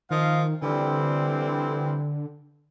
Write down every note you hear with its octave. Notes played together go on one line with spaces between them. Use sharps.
D#3 F3 D#5 F5
D3 E3 G3 C4